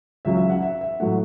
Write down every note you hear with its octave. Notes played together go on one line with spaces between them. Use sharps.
C#2 C#3 F#3 E5
E5
F#5
E5
E5
A2 F#3 A3 F#5